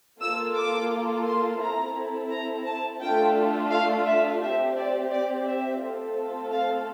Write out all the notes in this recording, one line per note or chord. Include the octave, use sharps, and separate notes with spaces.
A#3 F4 A4 E6
D6
C6
C4 E4 A4 A#5
A#5
A5
A3 D4 F4 A4 G5
F5
E5
C4 G4 E5
D5
D5
E5
A3 C4 F4 A4
F5